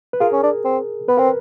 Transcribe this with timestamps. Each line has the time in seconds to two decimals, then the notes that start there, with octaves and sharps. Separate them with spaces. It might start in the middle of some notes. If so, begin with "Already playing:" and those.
0.13 B4
0.20 F4 G#4 A#4
0.32 C#4
0.43 D4
0.64 C4
1.08 B3 B4
1.17 C4 A#4